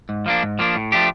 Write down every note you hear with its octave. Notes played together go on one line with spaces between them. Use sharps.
G#2
F3 A#3 D4
G#2
F3 A#3 D4
A2
F3 A3 D4 G4